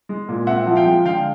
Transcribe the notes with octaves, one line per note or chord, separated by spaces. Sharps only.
G#3
A#2
C4 E5 F#5
F3
F5 G5
G#3
D3 F5 G5